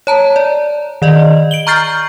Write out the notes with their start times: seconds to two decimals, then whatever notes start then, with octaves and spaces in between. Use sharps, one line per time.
0.07 C#5 A5 A#5
0.36 D5
1.02 D#3 D5 D#5
1.51 D7 F#7 G7
1.67 A#5 C#6 F6 G6 A6 C7